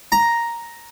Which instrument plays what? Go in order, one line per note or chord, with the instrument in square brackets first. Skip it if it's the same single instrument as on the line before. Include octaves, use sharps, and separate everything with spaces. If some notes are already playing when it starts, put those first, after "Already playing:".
[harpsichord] A#5